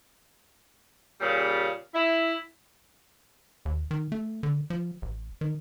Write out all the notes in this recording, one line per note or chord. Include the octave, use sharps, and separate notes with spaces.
A#2 C#3 G3
E4
D#2
D#3
A3
D3
F3
A1
D#3